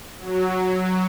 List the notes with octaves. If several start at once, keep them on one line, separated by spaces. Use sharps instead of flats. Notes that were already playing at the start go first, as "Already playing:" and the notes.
F#3